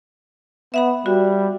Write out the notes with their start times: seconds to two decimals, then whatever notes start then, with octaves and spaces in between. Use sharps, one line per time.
0.74 B3 E5 F#5 B5
1.06 G3 F#4